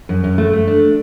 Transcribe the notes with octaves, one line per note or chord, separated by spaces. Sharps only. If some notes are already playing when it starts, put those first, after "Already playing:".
F#2
F#2
A3
A3
D4